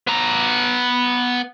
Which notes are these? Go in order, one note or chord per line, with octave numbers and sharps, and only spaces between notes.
B3 A#5